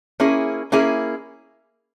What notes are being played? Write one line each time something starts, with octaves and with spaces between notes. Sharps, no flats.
A#3 C#4 E4 G#4
A#3 C#4 E4 G#4